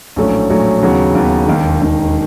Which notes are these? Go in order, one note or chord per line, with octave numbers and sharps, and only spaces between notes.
A#1 A2 F#3 A3 C#4
A#1 A2 F#3 A3 C#4
D#2 C#3 F#3 B3
D#2 C#3 F#3 B3
E1 D#2 D#3
E1 D#2 D#3